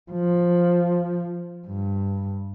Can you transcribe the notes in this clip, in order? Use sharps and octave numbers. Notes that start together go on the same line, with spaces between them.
F3
G2